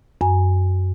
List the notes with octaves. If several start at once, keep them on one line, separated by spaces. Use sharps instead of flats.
F#2 G#5